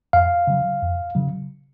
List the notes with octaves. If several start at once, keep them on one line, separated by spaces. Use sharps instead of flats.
F2 F5
C#3 F#3
F2
C#3 F#3